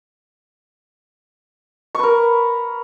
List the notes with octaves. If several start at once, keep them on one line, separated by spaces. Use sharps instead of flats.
A#4 B4 C#6